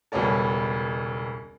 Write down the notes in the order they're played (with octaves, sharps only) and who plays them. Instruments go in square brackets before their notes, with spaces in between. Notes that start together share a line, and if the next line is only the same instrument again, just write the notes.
[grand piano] E1 C#2 G3 B3 C#4 A4